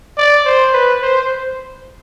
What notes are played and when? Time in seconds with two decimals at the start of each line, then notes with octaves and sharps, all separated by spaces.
0.18 D5
0.46 C5
0.73 B4
1.02 C5